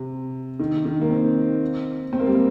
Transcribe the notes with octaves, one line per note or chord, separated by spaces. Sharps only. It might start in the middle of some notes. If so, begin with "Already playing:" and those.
Already playing: C3
D#3
D#3
A#3
C4
C4
A#3
G3
A#3